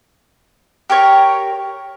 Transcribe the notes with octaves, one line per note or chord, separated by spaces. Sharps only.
G4 A#4 C#5